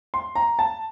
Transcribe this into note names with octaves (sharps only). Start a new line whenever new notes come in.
C6
A#5
A5